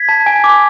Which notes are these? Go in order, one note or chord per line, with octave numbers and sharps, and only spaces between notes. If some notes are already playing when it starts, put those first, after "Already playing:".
Already playing: G#6 B6
A5
G#5
D6